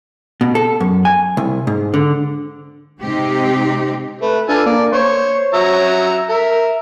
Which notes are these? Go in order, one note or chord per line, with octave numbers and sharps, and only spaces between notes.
B2
A4
F#2
G#5
C2
G#2
D3
C3 G#3 C4 D#4 G4
A3 B4
D4 F4 A4 G#5
A#3 D5
C5 C#5 C#6
F#3 E5 A#5
A#4 E5